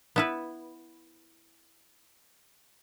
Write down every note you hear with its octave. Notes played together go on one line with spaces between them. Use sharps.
B3 E4 B4